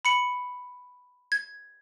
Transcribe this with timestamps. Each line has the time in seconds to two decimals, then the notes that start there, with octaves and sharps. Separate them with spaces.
0.05 B5 C#7 F#7
1.32 G#6